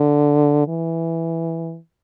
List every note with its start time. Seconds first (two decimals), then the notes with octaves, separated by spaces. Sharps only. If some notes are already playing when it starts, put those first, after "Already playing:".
Already playing: D3
0.68 E3